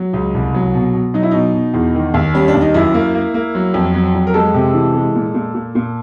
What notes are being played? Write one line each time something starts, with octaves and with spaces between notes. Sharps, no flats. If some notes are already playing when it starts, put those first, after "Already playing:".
Already playing: F#3
C#2
C2
F#3
B2
B2
F#3 D#4
E4
B2 D#4
B2
E2
D#3
D#2
G3 C#4
D4
D#2
D#4
F#2 E4
A#3
A#3
A#3
F#3
F2
F#3
F2
A#4
G#3 A4
C3
E3
G#3
A#2
A#2
A#2
A#2